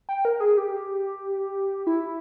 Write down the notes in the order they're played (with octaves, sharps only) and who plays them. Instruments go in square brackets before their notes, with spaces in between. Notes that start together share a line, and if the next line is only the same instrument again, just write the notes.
[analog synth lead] G5
A#4
G#4
G4
E4